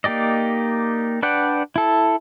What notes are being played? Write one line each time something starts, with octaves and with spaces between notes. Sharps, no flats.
A#3 D#4 G4 D5 D#5
D4 B4 D5 F#5 G5
E4 A4